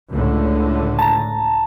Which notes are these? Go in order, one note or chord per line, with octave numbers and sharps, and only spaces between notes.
C#2 A2 D3
A5 A#5